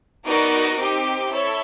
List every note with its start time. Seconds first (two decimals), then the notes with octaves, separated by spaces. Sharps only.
0.25 B3 D#4 F#4 A#4 D5
0.77 C4 D#4 G4
1.31 E4 A4 C#5